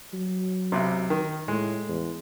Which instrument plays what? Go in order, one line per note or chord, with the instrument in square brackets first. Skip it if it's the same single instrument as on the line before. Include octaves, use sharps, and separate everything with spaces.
[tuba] F#3
[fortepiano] B1 C3
D#3
[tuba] A2 [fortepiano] G#3
[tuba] E2